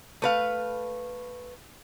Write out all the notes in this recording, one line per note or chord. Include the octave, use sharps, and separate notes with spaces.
A3 B4 F5